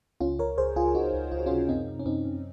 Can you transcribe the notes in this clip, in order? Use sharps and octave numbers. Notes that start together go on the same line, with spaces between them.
C#2 C#4 F4
C#2 A#4 C#5
C#2 G#4 C5
C#2 F4 G#4
G#4
C#2 D#4 F#4
C#2
C#2 F4
F#4
C#4 F4
C3
F#2 C4 D#4
F#2
C#4
F#2 C4 D#4
F#2